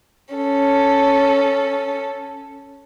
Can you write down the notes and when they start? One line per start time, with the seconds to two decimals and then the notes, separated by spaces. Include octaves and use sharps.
0.34 C#4 A4